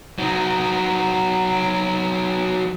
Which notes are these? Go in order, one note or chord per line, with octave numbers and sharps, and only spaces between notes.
F#3 D#4